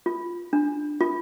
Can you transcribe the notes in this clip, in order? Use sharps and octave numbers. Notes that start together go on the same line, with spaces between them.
F4
D4
F4